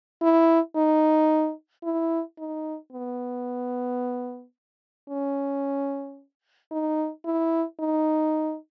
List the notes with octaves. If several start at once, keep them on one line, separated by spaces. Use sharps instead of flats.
E4
D#4
E4
D#4
B3
C#4
D#4
E4
D#4